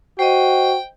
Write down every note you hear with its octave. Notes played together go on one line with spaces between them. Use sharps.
F#4 C5 D#5 G5